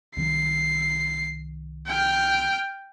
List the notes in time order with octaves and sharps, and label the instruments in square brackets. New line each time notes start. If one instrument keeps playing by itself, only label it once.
[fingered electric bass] C2 D#3 F#3 [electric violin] C7
[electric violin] G5 F6